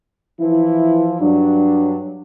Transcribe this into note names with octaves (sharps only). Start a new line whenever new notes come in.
E3 F3 E4
G2 F#3 D4